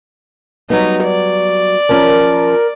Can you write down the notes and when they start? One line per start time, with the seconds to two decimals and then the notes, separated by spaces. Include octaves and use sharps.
0.70 F#3 G3 B3 D#4
1.04 D5
1.89 F3 C#4 A#4